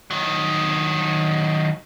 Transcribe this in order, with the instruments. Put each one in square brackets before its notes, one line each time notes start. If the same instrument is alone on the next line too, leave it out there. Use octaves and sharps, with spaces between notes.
[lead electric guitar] D#3 F#3